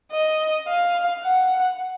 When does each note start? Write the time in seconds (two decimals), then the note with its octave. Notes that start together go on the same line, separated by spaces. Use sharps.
0.12 D#5
0.68 F5
1.24 F#5